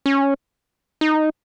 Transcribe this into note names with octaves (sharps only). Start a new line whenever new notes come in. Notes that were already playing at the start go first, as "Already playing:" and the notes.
C#4
D#4